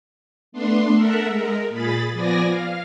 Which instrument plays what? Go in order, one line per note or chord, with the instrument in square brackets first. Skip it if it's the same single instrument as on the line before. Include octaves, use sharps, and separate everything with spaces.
[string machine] A3 B3 D4 C6
A4 A#4 E5 F#5
G#3 A#4
A#2 G#4 B5 A6
F3 B3 D5 G#5 A#6
F5